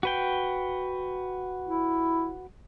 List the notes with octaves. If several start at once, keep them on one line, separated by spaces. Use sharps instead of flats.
F#4 B4 G5
E4